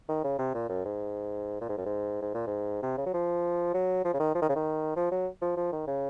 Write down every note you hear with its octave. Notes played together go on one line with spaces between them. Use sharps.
D#3
C#3
C3
A#2
F#2
G#2
A#2
G#2
F#2
G#2
G#2
A#2
G#2
C3
C#3
F#3
F3
F#3
F3
C#3
D#3
F3
D#3
C#3
D#3
F3
F#3
F3
F3
D#3
C#3